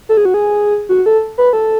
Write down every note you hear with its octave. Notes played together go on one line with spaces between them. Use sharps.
A4
G#4
F#4
G#4
F#4
A4
B4
A4